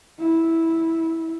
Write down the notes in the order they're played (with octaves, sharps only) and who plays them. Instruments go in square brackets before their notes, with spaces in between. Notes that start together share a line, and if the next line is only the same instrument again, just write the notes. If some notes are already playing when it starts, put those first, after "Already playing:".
[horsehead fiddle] E4